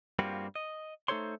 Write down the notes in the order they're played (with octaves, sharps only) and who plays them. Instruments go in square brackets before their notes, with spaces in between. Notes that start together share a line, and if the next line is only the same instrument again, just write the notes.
[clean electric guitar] G2 G3 A#3 C4 F4 F#4
D#5
A3 D#4 A4 C5 C#5 C6